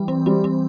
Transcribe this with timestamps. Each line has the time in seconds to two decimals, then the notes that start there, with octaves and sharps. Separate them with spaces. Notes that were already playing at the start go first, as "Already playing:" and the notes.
Already playing: E3 G3
0.08 C4
0.26 G3 C4
0.44 C4